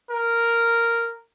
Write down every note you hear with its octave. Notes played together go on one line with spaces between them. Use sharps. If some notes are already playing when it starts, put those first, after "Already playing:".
A#4